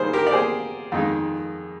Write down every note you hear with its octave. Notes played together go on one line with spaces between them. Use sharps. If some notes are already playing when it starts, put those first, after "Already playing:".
Already playing: D#3 G3 C4 D#4 G#4 A#4 C5
G4 A#4
D5
G#4 C5
F2 D#3 G#3 D#4